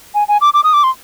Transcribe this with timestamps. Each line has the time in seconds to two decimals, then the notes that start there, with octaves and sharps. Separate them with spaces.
0.15 G#5
0.28 G#5
0.41 D6
0.54 D6
0.64 D#6
0.73 D6
0.84 C6